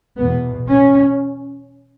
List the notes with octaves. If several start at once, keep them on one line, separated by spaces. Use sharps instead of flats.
E2 B2 B3
C#4